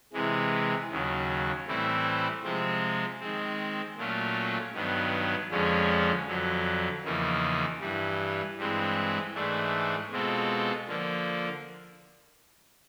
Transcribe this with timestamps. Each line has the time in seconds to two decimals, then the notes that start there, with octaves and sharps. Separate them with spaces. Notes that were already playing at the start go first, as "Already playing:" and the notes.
0.13 C3 E3 G#3
0.90 D#2 C#3 F#3
1.67 A2 E3 G3 C4 E4
2.43 C3 F3 G#3 C4
3.20 D#3 G#3 C4
3.96 A#2 F#3 A3 C#4 F4
4.74 G2 D#3 F#3 B3
5.50 F2 D3 F3 G#3 C#4
6.27 F2 D3 F#3
7.03 E2 C#3 F3 A#3 D#4
7.80 G2 E3 G3
8.57 G2 E3 G#3 C4
9.34 G#2 E3 A3 D4
10.10 B2 G#3 C4 F4 A4
10.87 D3 F3 A#3